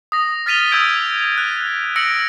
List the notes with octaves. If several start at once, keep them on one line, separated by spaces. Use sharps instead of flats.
D#6 A#6
F6 A6 B6 D#7 F7 G7
D#6 E6 G6 G#6 D7 D#7
F#6
E6 A#6 C#7 D7 F#7